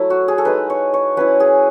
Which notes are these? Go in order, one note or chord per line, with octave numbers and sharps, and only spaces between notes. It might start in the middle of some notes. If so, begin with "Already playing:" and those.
Already playing: F#3 A3 E4
F#4
G#4
A4
G#3 D#4 B4
C#5
C#5
F#3 C#4 E4 B4
G#4